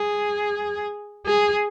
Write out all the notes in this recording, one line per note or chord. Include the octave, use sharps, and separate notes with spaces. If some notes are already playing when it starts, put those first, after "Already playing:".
Already playing: G#4
G#4